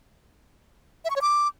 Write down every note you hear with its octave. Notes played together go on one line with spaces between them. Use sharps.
E5
C#6
C#5
D6